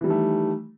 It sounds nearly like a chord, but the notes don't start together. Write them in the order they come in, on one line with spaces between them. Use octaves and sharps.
E3 G3 D#3 A3